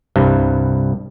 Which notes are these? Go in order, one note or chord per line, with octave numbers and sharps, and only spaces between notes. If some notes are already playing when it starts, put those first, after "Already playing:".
C2 G2